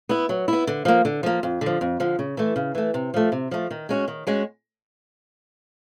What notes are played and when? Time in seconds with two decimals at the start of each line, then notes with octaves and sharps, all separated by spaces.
0.09 B3 E4
0.29 F#3
0.48 B3 E4
0.67 D3
0.85 F3 A#3
1.05 D3
1.23 F3 A#3
1.43 F2
1.61 D3
1.66 F3
1.81 F2
2.00 D3 F3
2.19 C#3
2.37 E3 A3
2.56 C#3
2.75 E3 A3
2.94 C3
3.14 F3 A3
3.32 C3
3.51 F3 A3
3.71 D#3
3.89 G#3 C#4 F#4
4.08 D#3
4.27 G#3 C#4 F#4